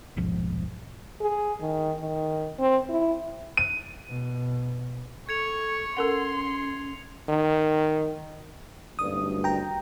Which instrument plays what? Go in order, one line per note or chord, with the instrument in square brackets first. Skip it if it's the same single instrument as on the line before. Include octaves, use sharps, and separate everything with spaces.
[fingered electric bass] D#1 B1 G#2 F3
[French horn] G#4
D#3
D#3
C4
E4
[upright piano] D#7
[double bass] B2
[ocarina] A4 [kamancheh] C#6 [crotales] G#6 C#7 F7
[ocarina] C#4 [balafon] A4 A#4 F#5 [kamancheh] C6 [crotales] F7
[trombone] D#3
[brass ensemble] F#1 D2 G2 [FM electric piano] D#6
[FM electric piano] G5 A#5